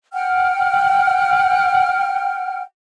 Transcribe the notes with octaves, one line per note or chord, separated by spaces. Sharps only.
F#5 G5 F6